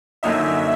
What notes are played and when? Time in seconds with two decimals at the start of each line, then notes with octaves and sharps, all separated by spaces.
0.23 F#2 D3 F#3 A#3 D#4 E5